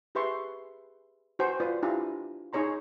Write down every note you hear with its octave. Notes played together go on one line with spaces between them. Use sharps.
G4 G#4 B4 E5 C6 C#6
F#4 B4 C5 G#5
F4 B4 D5 D#6
D4 E4 F4 G4 G#5 A#5
D#4 G#4 C#5 A#5 C6